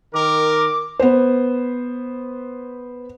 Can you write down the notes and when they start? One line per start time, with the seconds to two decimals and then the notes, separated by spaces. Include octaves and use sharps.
0.14 D#3 A#4 D6
0.99 B3 B4 C5